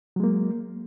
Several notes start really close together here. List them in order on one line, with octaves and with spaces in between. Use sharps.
F#3 G#3 A#3